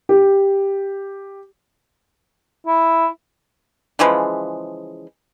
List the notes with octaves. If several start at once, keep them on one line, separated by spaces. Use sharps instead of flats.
G4
E4
C#3 E3 F3 G#3